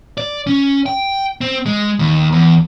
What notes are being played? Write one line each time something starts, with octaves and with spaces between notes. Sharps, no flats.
D5
C#4
G5
C4
G#3
D#2
E2